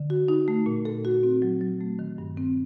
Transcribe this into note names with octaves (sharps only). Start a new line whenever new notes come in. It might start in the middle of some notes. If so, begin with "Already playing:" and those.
Already playing: D3
F#4
D#4
A3
A#2
A4
F#4
C4
F#3
F#3
A3
D#3
G2
C4